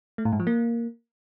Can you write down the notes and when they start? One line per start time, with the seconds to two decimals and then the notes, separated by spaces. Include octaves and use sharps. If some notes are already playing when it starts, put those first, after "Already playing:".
0.18 A3
0.25 A2
0.32 G#2
0.40 F3
0.47 A#3